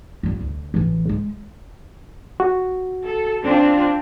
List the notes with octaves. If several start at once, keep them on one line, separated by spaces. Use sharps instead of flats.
G3 F4
D2
A1 E3
G#3
F#4
A4
C4 D4 F4